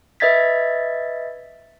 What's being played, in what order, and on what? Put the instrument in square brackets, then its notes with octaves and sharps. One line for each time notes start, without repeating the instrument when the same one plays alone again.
[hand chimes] B4 D#5 E5 G#6 A6 B6